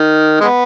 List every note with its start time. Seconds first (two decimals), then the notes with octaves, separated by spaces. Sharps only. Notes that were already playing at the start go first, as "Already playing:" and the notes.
Already playing: D#3
0.41 G#3 B3